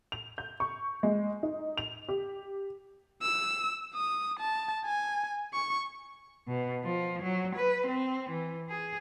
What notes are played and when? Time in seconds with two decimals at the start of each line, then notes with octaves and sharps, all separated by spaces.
0.12 F7
0.38 G6
0.60 C#6
1.03 G#3
1.43 D#4
1.78 F7
2.09 G4
3.22 E6
3.94 D#6
4.40 A5
4.85 G#5
5.54 C#6
6.48 B2
6.84 F3
7.22 F#3
7.56 B4
7.87 C4
8.30 E3
8.69 G#4